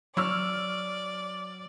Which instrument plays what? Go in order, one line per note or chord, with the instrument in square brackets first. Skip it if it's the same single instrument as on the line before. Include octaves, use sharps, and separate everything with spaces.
[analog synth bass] F#3 [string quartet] D5 [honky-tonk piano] C#6 E6 F6